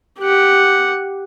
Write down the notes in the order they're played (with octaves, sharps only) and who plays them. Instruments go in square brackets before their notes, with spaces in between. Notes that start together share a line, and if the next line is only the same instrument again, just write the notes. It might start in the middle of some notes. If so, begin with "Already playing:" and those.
[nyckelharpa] G4 F#5